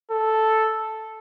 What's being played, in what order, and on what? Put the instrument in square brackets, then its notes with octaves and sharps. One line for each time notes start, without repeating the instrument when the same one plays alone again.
[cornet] A4